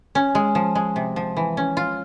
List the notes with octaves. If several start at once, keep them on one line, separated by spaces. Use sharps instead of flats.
C#4
G#3
F3
G#3
C3
F3
E3
C#4
F4